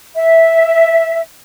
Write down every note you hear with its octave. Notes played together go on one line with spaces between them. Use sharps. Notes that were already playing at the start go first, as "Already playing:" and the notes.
E5